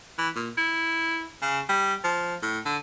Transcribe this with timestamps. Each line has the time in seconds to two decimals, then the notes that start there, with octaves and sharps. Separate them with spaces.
0.18 E3
0.36 A#2
0.58 E4
1.42 C#3
1.69 G3
2.04 F3
2.42 A2
2.65 D3